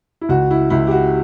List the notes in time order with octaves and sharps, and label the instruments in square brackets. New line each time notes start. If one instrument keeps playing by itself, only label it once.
[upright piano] E4
C#2 F#4
E4
C#2 E4
G4
F#4